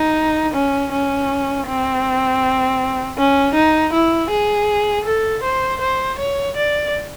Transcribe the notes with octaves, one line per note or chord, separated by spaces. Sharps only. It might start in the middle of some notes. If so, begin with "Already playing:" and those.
Already playing: D#4
C#4
C#4
C4
C#4
D#4
E4
G#4
A4
C5
C5
C#5
D5